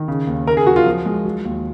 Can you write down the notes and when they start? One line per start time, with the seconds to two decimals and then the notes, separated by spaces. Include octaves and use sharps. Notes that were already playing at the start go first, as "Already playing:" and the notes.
Already playing: D#3
0.08 C#3
0.27 D#2
0.47 C#3 A#4
0.57 G#4
0.67 F#3 F#4
0.76 F4
0.86 F3
1.05 G#3
1.25 F#3
1.45 D#2